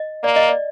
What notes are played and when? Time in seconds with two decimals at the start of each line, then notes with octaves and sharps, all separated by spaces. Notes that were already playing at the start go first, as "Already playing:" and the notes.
Already playing: D#5
0.24 A#3 D5
0.36 D#5
0.49 D5